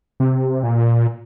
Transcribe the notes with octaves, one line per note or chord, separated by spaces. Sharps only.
C3
A#2